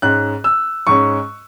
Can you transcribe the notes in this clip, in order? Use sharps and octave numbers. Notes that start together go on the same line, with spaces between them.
G#2 G#3 C#4 F#6
E6
G#2 G#3 C#4 C#6